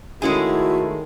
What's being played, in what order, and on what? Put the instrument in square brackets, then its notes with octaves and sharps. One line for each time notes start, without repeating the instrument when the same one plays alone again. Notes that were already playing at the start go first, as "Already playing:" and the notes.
[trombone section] D#3 A3 [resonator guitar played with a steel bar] G#3 C#4 G#4 [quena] E4 [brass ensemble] F#4